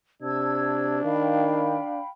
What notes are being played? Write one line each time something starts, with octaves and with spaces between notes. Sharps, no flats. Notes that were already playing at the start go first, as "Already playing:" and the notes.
C3 D4 A5 E6 G#6
D#3 F5 G5 B5